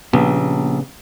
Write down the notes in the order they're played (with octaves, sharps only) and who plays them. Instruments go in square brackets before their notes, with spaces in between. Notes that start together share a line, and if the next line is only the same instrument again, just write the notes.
[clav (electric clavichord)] A#1 [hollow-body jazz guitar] C#3 B3 G4